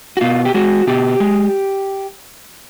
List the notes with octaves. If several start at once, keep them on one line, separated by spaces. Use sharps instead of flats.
F#4
B2 F4
G4
G#3 F#4
B2 G4
G#3